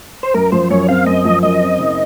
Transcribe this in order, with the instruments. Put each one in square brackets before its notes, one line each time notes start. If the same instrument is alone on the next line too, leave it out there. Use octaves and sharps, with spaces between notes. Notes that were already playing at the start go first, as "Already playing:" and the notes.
[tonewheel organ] C5
[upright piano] F#2 [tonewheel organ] A#4
[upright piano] F3 [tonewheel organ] C5
[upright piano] F#2 [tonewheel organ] C#5
[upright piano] C4 [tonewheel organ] F5
[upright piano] F#2 [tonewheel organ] D#5
[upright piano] F3
[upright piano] F#2 [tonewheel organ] D#5
[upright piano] C4
F#1